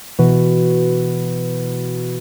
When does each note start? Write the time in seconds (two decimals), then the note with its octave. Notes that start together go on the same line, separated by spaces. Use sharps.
0.19 B2 E3 F#4 B4